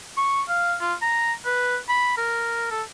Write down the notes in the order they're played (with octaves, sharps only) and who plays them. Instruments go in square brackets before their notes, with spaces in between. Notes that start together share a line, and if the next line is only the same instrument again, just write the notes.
[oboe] C#6
F5
F4
A#5
B4
B5
A#4
A4